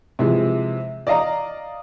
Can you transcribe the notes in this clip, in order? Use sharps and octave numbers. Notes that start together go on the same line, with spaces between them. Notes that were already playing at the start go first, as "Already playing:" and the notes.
C3 E3 F3 G#3
D5 D#5 F5 A#5